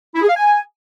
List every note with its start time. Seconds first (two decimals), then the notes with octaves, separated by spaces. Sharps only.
0.15 E4
0.22 G#4
0.29 F5
0.36 G#5